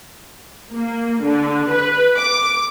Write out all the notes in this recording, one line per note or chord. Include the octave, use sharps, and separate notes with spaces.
A#3
D3
B4
D6